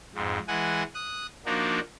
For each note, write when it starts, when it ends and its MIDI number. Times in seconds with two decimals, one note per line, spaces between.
0.15 0.38 41
0.15 0.38 44
0.48 0.83 52
0.48 0.83 56
0.48 0.83 78
0.48 0.83 80
0.95 1.27 87
0.95 1.27 90
1.46 1.80 53
1.46 1.80 58
1.46 1.80 62
1.46 1.80 63
1.46 1.80 66